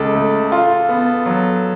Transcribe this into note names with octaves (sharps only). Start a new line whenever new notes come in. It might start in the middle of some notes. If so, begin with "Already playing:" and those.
Already playing: C#2 A4
A3
F4 A4
B3
F#3